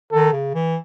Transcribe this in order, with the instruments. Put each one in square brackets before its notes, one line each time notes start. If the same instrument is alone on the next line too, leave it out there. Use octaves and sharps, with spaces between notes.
[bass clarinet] D#3 [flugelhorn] A4
[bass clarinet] C#3
E3